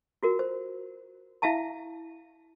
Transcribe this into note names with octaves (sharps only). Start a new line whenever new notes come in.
F4 F#4 A#4
C5
E4 E5 F5 A5 A#5